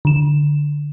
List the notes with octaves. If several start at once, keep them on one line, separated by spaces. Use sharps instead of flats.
D3 E7